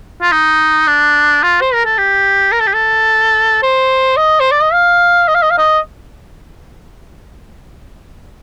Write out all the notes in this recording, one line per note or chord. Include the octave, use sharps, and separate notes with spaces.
F4
D#4
D4
F4
C5
A#4
A4
G4
A#4
A4
G4
A4
C5
D#5
C5
D5
D#5
F5
D#5
F5
D#5
F5
D#5